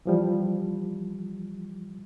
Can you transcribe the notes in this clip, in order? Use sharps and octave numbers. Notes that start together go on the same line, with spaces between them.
E3 F3 G3